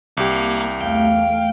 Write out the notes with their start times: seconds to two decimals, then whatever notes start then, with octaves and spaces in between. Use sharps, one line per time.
0.17 C2 A#3 G4
0.81 E2 A3 F5 G5